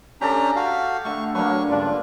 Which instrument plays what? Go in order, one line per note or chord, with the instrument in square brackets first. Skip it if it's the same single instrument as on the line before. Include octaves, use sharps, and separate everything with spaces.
[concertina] C#4 D4 A#5 [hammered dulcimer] G4 A4
[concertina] F#4 F5
[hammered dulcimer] D3 A3 [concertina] C#6
[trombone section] F#3 [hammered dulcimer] A#3 B4 [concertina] D4 C#6
[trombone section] C#2 G2 D4 [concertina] F4